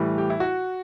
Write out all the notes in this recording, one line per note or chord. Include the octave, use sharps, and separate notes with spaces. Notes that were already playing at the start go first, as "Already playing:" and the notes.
Already playing: A2 E3 G3
G4
E4
F#4